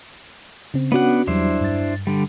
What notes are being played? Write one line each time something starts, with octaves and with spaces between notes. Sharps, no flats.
C#3 C4
B3 C#4 D4 F#4 F#5
E2 F#3 G3 D4 E4 C5
G2 A6
D3 G3